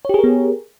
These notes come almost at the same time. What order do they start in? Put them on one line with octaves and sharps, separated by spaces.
C#5 G4 G#4 A#4 B3